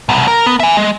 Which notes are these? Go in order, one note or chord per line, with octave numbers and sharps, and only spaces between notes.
C2 B2
A#4
B3
E5 G#5
G#3